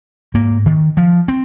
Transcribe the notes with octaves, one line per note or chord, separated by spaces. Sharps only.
G#2 A#3
D#3
F3
C4